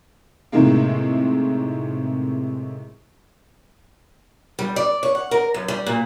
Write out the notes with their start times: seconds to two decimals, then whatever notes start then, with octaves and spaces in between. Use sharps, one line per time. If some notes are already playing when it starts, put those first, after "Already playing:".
0.52 A2 C3 D#3 G#3 A#3
4.59 G3
4.76 D5
5.03 C#5
5.15 F#5
5.31 A#4
5.54 F#2
5.68 G3
5.86 A#2